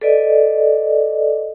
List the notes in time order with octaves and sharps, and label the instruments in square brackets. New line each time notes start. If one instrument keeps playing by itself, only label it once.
[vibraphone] A4 B4 D5 D#5